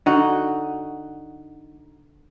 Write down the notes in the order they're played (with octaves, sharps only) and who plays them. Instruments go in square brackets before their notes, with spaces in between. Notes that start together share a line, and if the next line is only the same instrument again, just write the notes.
[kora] D3 D#4 F#4